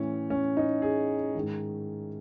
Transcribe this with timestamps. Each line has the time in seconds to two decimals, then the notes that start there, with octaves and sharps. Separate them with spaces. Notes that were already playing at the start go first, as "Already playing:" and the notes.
Already playing: A2 E3 C#4
0.30 C#4
0.57 D#4
0.82 G#4
1.35 G#2 D#3